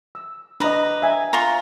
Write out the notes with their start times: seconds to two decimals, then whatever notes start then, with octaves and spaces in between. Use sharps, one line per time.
0.15 E6
0.60 D4 B4 D#5 A#5
1.02 E5 G#5
1.33 F4 C#5 A#5